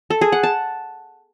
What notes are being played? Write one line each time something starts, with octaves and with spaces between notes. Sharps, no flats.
A4
G#4
F#5
A5